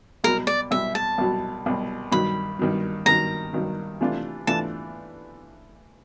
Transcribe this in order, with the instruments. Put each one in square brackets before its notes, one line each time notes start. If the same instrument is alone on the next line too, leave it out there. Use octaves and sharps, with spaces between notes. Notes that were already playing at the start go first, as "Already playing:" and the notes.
[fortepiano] C2 B2 F#3 [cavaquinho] A#4
[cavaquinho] D5
[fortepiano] C2 B2 F#3 [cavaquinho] E5
[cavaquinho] A5
[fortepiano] C2 B2 F#3
C2 B2 F#3
[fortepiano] G2 D#3 F#3 [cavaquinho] B5
[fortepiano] G2 D#3 F#3
[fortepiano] G2 D#3 F#3 [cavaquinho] A#5
[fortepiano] G2 D#3 F#3
C3 E3 A3 D4 F4
[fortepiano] E3 A3 D4 F4 [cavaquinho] A5